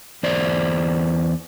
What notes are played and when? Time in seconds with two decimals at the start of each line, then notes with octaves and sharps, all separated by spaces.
0.23 E2 C5 D5